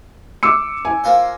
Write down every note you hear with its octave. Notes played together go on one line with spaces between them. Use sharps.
D6 E6 C#7
G#5
A#3 F4 C5